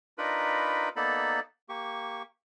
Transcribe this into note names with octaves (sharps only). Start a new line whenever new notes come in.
D4 D#4 F4 A#4 B4 B5
A#3 B3 D#4 A4 D5 B5
A#3 G4 C#6